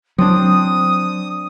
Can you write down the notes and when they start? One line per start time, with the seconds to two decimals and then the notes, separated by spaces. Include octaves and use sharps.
0.18 F#3 C4 D4 D#6